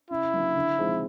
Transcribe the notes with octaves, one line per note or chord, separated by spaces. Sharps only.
C#3 E4
F#3 A#3 D4
D3
F3 G#3 C4 D#4